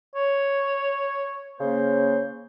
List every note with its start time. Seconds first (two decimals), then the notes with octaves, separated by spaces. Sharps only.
0.15 C#5
1.59 C#3 A#3 C5